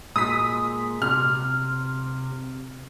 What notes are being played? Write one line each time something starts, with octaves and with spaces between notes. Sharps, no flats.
A#2 G#3 D#6 B6
C3 F6